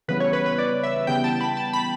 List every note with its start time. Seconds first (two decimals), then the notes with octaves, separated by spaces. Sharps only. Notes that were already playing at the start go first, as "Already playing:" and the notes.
0.08 C#3 E3 G3 B3 B4
0.20 C#5
0.33 B4
0.46 B4
0.59 D5
0.83 E5
1.07 C#3 E3 G3 B3 G5
1.24 A5
1.41 B5
1.57 A5
1.73 B5